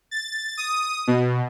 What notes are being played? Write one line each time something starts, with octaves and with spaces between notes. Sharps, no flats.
A6
D#6
B2